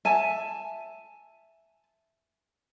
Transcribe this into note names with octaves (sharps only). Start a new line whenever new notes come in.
E5 G#5 A5